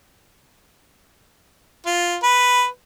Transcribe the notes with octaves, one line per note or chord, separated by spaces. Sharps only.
F4
B4